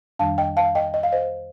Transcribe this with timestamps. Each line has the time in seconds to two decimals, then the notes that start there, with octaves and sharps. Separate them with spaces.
0.19 F2 D#3 G3 D4 F5 A5
0.38 D#5 G5
0.57 F5 A5
0.75 D#5 G5
0.94 D#5
1.03 F5
1.12 C5 D#5